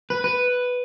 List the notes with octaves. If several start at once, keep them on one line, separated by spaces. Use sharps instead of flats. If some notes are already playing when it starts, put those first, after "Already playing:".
B4
B4